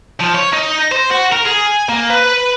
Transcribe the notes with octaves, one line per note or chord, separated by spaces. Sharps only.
F3
C#5
D#4
C5
F#4
A#4
G#4
G#5
A#3
B4